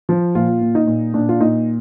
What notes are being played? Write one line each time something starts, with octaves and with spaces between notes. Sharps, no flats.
F3
A#2 F4
A#2
D#4
A#2
A#2 D4
F4
A#2 D#4